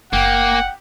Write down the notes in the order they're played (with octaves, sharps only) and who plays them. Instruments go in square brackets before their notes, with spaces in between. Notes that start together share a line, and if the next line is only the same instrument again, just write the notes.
[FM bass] F#1 [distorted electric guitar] A#3 [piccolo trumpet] F#5 [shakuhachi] G5